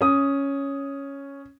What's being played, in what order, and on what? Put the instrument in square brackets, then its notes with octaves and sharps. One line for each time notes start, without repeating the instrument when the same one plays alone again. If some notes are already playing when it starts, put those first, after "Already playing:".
[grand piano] C#4 D#6